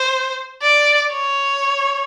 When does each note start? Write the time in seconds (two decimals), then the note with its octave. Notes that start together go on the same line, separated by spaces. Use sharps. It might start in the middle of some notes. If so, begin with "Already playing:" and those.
Already playing: C5
0.62 D5
1.13 C#5